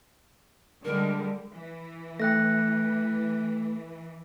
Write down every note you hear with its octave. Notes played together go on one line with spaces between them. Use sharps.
D3 G3 G#3 A#4
E3
A3 G5 F#6 A#6